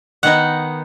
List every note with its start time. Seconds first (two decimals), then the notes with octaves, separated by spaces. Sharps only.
0.23 D#3 B3 D#4 F#5